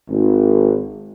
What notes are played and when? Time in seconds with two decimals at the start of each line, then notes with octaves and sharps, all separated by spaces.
0.10 G#1